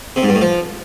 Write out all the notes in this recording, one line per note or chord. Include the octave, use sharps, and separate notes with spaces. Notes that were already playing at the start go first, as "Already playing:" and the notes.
C3
G#2
G2
A2
F3